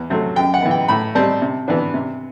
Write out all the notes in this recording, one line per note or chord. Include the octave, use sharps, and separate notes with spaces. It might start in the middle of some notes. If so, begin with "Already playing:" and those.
Already playing: E2
C3 F#3 A3 C4
F#2 G5
F#5
E3 B3
G5
A2 B5
G3 C4 A5
C3
E3 B3 D4
C3